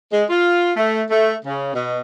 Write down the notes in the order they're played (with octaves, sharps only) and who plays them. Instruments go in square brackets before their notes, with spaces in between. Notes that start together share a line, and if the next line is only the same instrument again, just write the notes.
[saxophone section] G#3
F4
A3
A3
C#3
B2